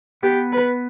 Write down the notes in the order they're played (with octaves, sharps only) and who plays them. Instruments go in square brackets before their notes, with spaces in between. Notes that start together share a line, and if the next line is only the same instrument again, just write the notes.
[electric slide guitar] B3 [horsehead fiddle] G4
[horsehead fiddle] B4